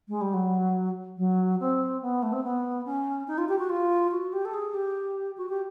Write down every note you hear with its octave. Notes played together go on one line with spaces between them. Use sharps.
G#3
G3
F#3
F#3
C4
B3
A3
C4
B3
C#4
D#4
F4
G4
F#4
F4
F#4
G4
A4
G#4
G4
F#4
G4